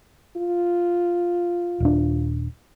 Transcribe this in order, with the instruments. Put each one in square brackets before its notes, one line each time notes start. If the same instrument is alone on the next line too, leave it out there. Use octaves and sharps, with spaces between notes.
[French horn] F4
[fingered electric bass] D#1 D4